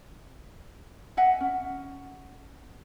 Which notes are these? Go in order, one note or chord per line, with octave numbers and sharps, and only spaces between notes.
D#5 E5 F#5 G#5
C#4